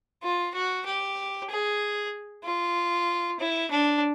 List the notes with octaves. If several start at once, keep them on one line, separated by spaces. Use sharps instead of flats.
F4
F#4
G4
G#4
F4
E4
D4